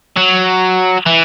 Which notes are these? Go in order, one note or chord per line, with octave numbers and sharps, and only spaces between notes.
F#3
E3